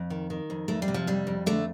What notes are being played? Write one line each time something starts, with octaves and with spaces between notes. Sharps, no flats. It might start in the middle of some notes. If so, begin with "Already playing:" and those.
Already playing: F2
D#3
D#3
F2
F2 A3
G3
C3
F3
F2 G3
F2
D3 A3